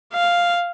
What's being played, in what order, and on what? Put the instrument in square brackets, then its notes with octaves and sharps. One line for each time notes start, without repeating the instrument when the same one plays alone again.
[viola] F5